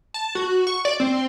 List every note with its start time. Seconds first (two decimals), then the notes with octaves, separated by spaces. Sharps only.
0.14 A5
0.35 F#4
0.67 C#6
0.85 D5
1.00 C4